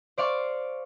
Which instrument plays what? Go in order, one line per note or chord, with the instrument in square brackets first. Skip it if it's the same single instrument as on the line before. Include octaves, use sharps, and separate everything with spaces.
[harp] C5 D5 F5 C#6 D6